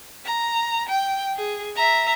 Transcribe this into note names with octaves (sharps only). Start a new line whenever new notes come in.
A#5
G5
G#4
E5 A#5